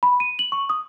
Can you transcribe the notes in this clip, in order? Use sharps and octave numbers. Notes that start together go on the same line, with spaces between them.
B5
D#7
F#7
C#6
D#6